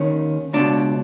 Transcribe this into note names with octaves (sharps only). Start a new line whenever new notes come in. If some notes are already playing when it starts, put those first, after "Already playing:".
Already playing: D#2 D#3 C#4
C#2 B2 D4